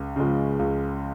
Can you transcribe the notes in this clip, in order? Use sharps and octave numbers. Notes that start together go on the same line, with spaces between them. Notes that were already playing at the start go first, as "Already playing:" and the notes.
Already playing: C#2
C#3 F3 G#3
C#2